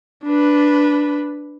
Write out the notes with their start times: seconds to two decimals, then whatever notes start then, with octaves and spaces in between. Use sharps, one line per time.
0.25 D4 B4